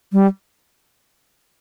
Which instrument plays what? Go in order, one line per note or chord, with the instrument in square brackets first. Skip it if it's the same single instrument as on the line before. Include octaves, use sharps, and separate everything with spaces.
[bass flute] G3